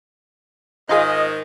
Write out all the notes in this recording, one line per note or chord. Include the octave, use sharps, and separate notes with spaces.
G#2 D#3 D#4 F4 G#4 D#5